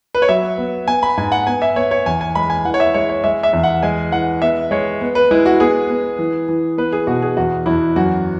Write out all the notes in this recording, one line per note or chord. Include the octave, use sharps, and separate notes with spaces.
B4
C#5
F#3 E5
B3
B3 G#5
B5
G#2 G#5
F#5
B3 G#5
E5
B3 C#5
C#5
E2 G#5
G#5
G#3 B5
G#5
E3 F#5
C#5
E5
G#3 C#5
C#5
G#3 E5
E5
E2
F#5
G#3 G#5
E3 F#5
B3 E5
G#3 C#5
B3
B4
G#3 E4
F#4
B3 G#4
B3
E3
E3
B3 B4
G#4
B2 F#4
G#4
E2 F#4
E2 E4
F#2 F#4